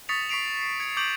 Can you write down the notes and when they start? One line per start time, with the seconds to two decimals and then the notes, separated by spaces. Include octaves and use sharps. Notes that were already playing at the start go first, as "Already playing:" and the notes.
0.09 C#6 D#6 A6 B6 C#7 F7
0.29 C#6 B6 C7 D7 F7
0.61 C7
0.80 G#6 C#7
0.97 C#6 D6 G6 D7 F#7